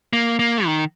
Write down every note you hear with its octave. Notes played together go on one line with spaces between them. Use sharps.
A#3
A#3
D#3